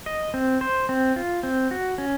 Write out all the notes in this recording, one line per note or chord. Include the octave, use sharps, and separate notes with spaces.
D#5
C4
C5
C4
F4
C4
F#4
C#4